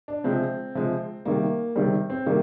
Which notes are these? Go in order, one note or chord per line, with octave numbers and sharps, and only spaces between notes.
D4
C3 F3 G#3 C4
C3 F3 G#3
C3 D#3 G3 A#3
C3 D#3 G3 C4
C4
C3 D#3 G3 A#3